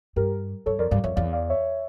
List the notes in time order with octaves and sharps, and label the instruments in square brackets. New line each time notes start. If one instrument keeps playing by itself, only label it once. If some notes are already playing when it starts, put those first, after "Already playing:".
[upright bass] G2 [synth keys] G4 A#4
[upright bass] G2 [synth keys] A4 C#5
[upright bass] F2 [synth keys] A#4 D5
[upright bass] G2 [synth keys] D5 F5
[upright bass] F2 [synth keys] C#5 E5
[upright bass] E2 [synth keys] D5 F5
[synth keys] D5 F5
C#5 E5